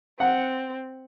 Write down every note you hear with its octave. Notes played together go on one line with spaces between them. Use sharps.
C4 F#5